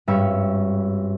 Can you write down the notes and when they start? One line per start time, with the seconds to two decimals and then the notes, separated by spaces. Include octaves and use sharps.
0.07 G#1 G2 C#4 C#5 E5 B5